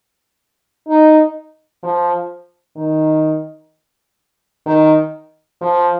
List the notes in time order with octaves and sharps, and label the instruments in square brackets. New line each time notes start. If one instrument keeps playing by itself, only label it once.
[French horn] D#4
F3
D#3
D#3
F3